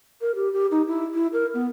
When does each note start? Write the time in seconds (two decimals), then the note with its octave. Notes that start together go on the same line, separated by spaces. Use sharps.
0.21 A#4
0.35 G4
0.53 G4
0.71 D#4
0.88 E4
1.15 E4
1.33 A#4
1.54 B3